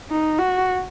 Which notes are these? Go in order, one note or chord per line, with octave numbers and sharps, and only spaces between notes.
D#4
F#4